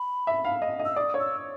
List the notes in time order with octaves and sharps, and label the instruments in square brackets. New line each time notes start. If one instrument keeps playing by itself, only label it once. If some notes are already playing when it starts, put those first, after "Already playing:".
Already playing: [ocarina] B5
[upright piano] E5
F5
D#5
D#5
[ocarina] E6
[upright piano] D5 [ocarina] D#6
[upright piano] C#5
[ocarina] E6